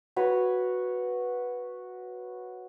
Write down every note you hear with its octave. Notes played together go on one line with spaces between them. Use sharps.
F#4 B4 C#5